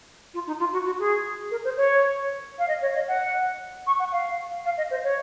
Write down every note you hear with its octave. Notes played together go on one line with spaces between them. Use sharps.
F4
D#4
F4
F#4
F#4
G#4
A#4
C5
C#5
F5
D#5
C#5
D#5
F#5
C#6
F#5
F5
F5
D#5
C5
C#5